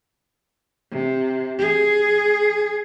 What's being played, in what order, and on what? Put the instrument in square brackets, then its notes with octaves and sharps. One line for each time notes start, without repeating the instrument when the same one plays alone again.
[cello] C3
G#4